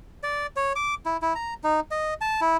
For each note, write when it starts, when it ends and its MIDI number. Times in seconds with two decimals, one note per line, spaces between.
0.23 0.47 74
0.56 0.73 73
0.76 0.94 86
1.06 1.17 64
1.22 1.34 64
1.35 1.54 82
1.64 1.80 63
1.91 2.14 75
2.21 2.40 81
2.41 2.57 64